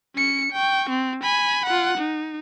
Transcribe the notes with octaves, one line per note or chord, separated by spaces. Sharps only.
C#4 C#7
G5 C#6
C4
G#5 B5
F4 F#5
D#4